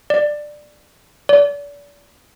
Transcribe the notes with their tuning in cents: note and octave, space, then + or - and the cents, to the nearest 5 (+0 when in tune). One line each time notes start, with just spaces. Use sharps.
D5 +15
D5 -35